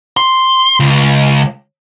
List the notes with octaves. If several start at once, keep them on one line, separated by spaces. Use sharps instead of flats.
C6
C#2